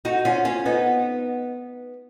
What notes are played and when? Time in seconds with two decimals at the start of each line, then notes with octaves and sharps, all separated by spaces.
0.05 D#4 F#4
0.25 C#4 F4
0.45 C#4 F4
0.66 B3 D#4